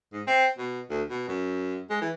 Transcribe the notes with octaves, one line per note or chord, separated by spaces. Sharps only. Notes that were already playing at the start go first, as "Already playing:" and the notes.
G#2
C4
B2
D2
B2
F#2
G#3
E3